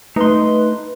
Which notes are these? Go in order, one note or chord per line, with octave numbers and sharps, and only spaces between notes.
A3 D#4 B4 C6